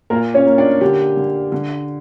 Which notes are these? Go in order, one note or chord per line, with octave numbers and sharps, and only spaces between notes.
A#2 A#3 A#4
C#4 C#5
A#3
D4 D5
D3 G4
D3
D3